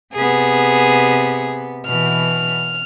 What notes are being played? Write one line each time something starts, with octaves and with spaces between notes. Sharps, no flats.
C3 B3 G#4
B2 E3 F6